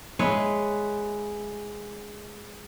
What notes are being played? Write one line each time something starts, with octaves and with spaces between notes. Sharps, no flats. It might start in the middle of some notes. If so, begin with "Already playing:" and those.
G#3 B4 C#5 E5